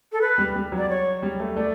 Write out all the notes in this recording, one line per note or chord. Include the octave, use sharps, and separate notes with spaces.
A4
B4
G3
G3
F#3
D5
C#5
G3
A3
A3 D5